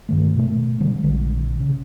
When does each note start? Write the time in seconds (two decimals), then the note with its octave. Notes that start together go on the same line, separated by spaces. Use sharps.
0.09 G2 D#3 A3
0.36 B2 A3
0.80 D3 G3 G#3
1.03 A#1 D3
1.60 C#3